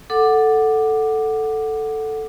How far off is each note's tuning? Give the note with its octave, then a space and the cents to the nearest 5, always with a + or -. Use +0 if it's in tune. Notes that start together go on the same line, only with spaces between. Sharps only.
A4 +0 F#5 +0 D6 +15